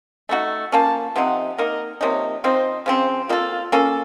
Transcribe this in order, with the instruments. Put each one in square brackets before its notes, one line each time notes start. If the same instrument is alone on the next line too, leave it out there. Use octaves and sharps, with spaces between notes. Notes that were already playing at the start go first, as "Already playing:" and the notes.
[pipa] A3 D#4 F#4
[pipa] F3 A#3 C#4 [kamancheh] A5
[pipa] C3 F3 C4 D#4 [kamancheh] F#5
[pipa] A#3 D#4 A#4 [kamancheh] D#5
[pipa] C3 F3 A#3 D#4 [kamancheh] C#5
[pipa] F3 C4 D#4 [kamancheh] C5
[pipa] C#3 F3 C4 [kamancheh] C5
[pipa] A#3 D#4 A4 [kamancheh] F4
[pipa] A#3 C#4 A4